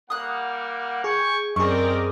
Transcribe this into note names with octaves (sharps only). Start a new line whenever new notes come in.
G3 A#3 F#5 D#6 F#6
G#4 G5 G#5 C#6
F#2 C4 G4 G#4 A#4 D5 D#5 C#6